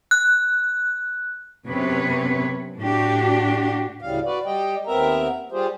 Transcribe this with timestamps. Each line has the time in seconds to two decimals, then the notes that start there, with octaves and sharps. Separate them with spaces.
0.11 F#6
1.65 F#2 C3 B3 C#4 B4 C#5
2.78 A2 D4 F#4 G4
4.01 D2 A2 C#3 G3 F5
4.25 F#4 B4 D5
4.45 G3 G4 D#5 G5
4.87 D#2 B3 C4 A#4 E5 A#5
5.52 G3 F4 G4 G#4 C5